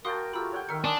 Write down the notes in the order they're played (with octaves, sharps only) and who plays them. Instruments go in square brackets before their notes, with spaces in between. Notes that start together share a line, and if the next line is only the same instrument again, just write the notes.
[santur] F#4 G5 A5 [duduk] A#4 [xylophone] F5 C6 D#6
[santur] A3 G4 A#4 [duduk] F4 [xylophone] B5 E6
[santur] C#5 F#5 G5
[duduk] D#3 [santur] A#4 E5 [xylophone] F6 C#7
[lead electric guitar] D4 [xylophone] G#5 C6 D#6